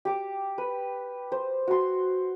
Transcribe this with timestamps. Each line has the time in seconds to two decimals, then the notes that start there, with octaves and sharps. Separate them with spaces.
0.05 G4 D6
0.58 B4
1.32 C5
1.68 F#4 C6